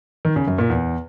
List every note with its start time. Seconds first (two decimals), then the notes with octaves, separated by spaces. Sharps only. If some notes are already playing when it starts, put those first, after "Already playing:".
0.25 D#3
0.36 C#3
0.47 F#2
0.58 A#2
0.70 E2